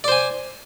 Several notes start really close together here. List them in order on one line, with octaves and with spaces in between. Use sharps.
D5 C5 G#5